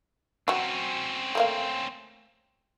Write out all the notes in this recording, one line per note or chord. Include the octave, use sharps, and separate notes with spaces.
F#3 C4 C#4 F#4
A3 A#3 F5